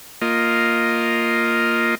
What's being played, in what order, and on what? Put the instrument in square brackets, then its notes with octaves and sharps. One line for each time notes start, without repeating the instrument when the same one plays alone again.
[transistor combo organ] A#3 F4 D#5